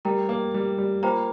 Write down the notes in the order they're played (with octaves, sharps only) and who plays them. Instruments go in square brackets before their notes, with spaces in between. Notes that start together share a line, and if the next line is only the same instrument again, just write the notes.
[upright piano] G3 [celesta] A#4 G5 A#5
[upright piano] A#3
G3
G3
[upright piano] A#3 [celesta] F4 C5 G5 A#5